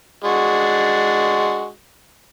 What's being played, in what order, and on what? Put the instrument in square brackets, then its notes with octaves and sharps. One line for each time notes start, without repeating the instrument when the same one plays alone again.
[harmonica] G#3 D4 F#4